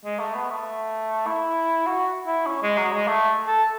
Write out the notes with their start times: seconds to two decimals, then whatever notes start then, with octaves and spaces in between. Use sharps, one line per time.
0.05 G#3
0.19 A3
0.35 B3
0.50 A3
1.26 E4
1.86 F#4
2.27 E4
2.46 C#4
2.62 G#3
2.78 F#3
2.92 G#3
3.08 A3
3.48 A4